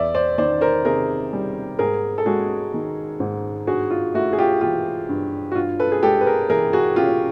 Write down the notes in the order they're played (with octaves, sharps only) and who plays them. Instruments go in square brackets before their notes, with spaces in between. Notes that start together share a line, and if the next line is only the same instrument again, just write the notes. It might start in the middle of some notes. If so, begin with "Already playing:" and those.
Already playing: [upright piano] E2 D5 E5
C5 D5
D#3 C5 D5
A#4 C5
C3 G#4 A#4
G3
G#2 G#4 A#4
A4
G#3 F#4 G#4
D#3
G#2
G2 F#4 G#4
F4
A3 E4 F#4
G#4
F4 G4
E3 F4 G4
G2
F#4
G2 F4
A4 B4
G#4
G#3 G4 A4
B4
G#4 A#4
E3 G#4 A#4
F#4 G#4
C#4 F4 G4